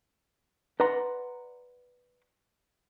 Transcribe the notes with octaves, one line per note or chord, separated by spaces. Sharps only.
B4 D5 F#5 A#5 C6